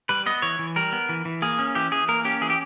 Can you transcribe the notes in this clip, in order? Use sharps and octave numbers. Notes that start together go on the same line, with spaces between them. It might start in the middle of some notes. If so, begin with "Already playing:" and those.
G3 B4
B3 D#5
E3 C#5
E3
G3 A#4
B3
E3
E3
A#3 G#4
C#4
E3 G4
E3 G#4
A#3 A#4
C#4 G4
E3 G#4
G4